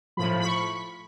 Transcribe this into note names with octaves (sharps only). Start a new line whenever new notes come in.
A2 F3 B5
B5
C#6